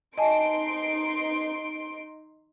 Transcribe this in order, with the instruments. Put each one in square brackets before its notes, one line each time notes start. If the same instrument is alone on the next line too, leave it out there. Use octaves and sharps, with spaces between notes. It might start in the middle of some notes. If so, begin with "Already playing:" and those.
[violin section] D#4 C6 D7 [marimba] D#5 G#5 A5